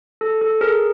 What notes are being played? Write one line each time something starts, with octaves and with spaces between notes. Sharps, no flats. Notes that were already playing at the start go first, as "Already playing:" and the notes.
A4
A4
G#4 A#4